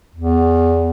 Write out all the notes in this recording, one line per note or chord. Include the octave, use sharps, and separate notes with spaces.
E2